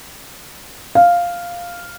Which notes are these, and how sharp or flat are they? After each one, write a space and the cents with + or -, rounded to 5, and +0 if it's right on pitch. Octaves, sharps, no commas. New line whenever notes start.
F5 +0